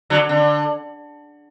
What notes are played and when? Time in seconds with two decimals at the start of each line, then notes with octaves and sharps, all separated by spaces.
0.10 D3 F#3
0.29 D3